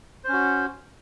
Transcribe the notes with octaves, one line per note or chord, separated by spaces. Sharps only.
C#4 F#4 C5